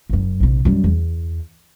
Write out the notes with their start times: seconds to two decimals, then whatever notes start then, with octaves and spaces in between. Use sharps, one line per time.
0.10 F#1 F#2
0.40 A#1 C3
0.65 F#2 G3
0.84 E2